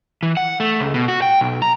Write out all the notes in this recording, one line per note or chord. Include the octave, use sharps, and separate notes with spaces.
E3
F#5
A3
C#2
B2
F#4
G5
B1
A#5